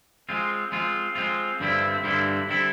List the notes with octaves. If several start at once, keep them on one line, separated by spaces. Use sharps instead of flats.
G#3 C4 F4
G#3 C4 F4
G#3 C4 F4
G2 D3 G3 C4 E4
G2 D3 G3 C4 E4
D3 G3 C4 E4